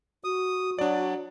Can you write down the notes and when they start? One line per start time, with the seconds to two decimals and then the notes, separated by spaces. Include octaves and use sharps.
0.24 F#4 D#6
0.79 F#3 D4 D5